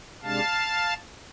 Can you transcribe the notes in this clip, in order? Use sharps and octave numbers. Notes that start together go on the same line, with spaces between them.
C3 G#3 D4 F5 A5